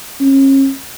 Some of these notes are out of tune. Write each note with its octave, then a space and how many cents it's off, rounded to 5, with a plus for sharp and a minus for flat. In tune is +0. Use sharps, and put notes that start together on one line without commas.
C#4 -35